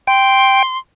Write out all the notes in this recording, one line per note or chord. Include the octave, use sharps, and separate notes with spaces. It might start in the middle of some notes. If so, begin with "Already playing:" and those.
G5 C6